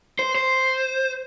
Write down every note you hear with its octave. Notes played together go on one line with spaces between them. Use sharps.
C5
C5